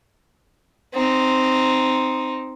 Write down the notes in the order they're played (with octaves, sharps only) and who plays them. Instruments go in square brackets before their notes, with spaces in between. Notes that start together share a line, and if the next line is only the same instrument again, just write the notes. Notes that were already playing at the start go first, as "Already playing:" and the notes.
[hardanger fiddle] C4 D#4